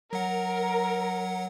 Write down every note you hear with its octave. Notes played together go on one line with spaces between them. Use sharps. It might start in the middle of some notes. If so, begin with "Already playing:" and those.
F#3 A#4 F#5